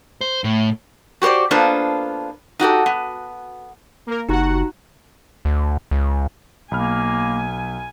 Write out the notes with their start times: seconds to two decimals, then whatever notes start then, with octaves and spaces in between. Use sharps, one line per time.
0.21 C5
0.44 A2
1.22 F#4 G4 A#4 C5 D5
1.51 A#3 B3 D4 F4 A4 C5
2.59 D#4 F#4 G4 A4
2.86 B3
4.07 A#3 A#4
4.29 F#1 D#4 F#4 G4 F#5 A#5
5.45 D2
5.91 C#2
6.71 B1 A#3 G#5 B5 F6